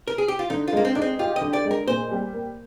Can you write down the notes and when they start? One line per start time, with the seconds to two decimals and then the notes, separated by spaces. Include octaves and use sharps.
0.08 A#4
0.18 G#4
0.28 G4
0.39 F4
0.50 D3 D#4
0.68 F4
0.73 G#3 A#3
0.85 C4
0.95 D4 D#4
1.02 C4
1.19 F4 G4
1.36 D#5
1.41 D3
1.53 D5
1.65 G#3
1.71 A#4
1.87 A#2 C5
2.11 G3
2.33 A#3